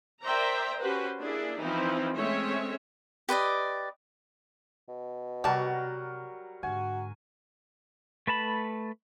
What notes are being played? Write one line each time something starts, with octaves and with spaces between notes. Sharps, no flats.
A#4 C5 D5 E5 G5 A#5
C#4 F#4 G4 B4 C5
A#3 D4 E4 G#4
E3 F3 C4 D#4 E4
G#3 A3 C4 C#4 C#5 E5
G4 B4 D5 D#5
B2
C3 F#3 G3 F#4 A#4 A5
G#2 D3 F#4 G#5
A3 B4 A5 B5